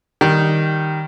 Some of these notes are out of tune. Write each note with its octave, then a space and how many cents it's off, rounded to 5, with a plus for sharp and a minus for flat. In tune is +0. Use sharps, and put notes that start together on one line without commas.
D#3 +0 G3 +0